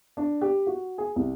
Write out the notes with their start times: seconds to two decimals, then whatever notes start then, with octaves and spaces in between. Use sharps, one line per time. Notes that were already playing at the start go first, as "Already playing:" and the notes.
0.17 D4
0.41 G4
0.67 F#4
0.98 G#4
1.16 C2